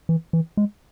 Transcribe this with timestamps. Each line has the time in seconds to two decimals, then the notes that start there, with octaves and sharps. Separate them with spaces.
0.09 E3
0.33 E3
0.57 G#3